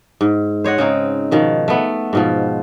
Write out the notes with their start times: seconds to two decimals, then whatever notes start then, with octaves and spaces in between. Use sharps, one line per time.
0.21 G#2
0.64 C5 C#5 D#5 F#5
0.78 C#3 C4 D#4
1.31 B2 D#3 F3
1.68 A3 B3
2.13 G#2 B2 F3